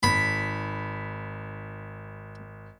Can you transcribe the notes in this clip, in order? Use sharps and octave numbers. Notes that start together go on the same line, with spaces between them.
G#1 B5